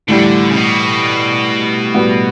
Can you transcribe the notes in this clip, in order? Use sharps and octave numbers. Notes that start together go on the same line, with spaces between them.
A2 D3 E3 G3
C#3
B2
A2 G3 B3 F#4